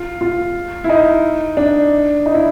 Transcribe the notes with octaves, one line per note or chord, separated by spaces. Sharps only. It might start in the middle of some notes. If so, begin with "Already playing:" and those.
Already playing: F4
F4
E4
D#4
D4
D#4
E4